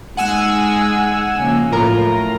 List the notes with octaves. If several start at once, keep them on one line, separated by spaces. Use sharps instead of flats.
G#3 D#4 G#4 F#5 G#5 E6
C#3 F3 A#3
F#2 A2 F4 A#4 A#5